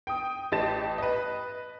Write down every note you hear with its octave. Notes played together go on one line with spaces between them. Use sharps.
G5 D#6
A1 G4 D#5 A5 A6 E7
B4 D#5